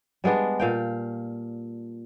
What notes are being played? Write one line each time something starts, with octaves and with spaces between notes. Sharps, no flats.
G3 G#3 B3 D4
A#2 F5 G5